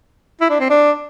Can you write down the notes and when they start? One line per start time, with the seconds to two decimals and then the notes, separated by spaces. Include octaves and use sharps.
0.41 E4
0.50 D4
0.60 C4
0.70 D4